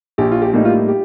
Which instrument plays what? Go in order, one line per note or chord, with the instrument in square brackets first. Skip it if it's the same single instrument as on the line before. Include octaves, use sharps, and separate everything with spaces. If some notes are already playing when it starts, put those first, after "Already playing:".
[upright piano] A#1 G4
F4
G4
A2 G3 A#3 D#4
F4
G4